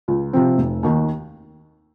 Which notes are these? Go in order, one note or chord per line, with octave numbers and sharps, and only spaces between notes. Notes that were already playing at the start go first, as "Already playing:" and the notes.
C#2
C3 F3 C4
F1
D#2 D#3